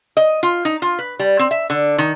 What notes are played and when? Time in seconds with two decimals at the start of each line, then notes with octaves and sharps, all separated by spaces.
0.17 D#5
0.43 F4
0.65 D#4
0.82 F4
0.99 B4
1.19 G3
1.39 C4
1.51 E5
1.70 D3
1.98 D#3